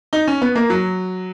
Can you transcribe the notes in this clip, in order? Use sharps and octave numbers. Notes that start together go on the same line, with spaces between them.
D#4
C#4
B3
A#3
F#3